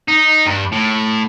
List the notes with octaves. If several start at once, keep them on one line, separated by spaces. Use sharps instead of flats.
D#4
G2
A2